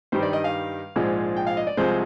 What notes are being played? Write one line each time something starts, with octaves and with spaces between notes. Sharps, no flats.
G2 D#3 G3 C5
D5
D#5
F5
A#1 G#2 F3 G#3
G5
F5
D#5
D5
C2 C3 F3 G#3 C5